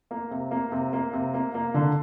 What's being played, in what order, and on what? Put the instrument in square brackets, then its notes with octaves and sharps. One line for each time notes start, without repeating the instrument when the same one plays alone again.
[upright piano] A#3
C3
A#3
C3
A#3
C3
A#3
A#3
D3